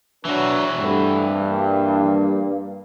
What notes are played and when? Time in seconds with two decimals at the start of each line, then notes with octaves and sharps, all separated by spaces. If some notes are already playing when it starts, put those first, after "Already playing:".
0.25 E3 F#3 D4 F#4 B4
0.79 G2 A3 C4 E4
1.47 A#3